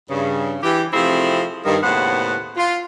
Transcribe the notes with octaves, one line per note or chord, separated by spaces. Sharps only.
G2 C#3
E3 G4
C3 F3 A3 C4 E4 G#4
G2 D#3
D#2 A2 C#3 B3 C5 F#5
F4